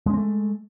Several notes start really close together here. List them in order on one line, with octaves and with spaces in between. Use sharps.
G#3 C#4 C4 A3